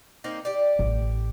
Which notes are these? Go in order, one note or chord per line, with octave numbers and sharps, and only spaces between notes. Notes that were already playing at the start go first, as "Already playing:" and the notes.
A#3 C4 D#4
G4 D5
A1